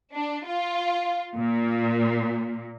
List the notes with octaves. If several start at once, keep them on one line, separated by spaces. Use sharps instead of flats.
D4
F4
A#2